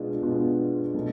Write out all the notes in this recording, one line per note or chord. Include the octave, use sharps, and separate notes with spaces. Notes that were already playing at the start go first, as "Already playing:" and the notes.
Already playing: B2 G#3 B3 D4 F4
B2 G#3 B3 D4 F4
B2 F#3 A3